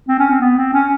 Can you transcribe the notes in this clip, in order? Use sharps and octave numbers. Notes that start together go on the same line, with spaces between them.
C4
C#4
C4
B3
C4
C#4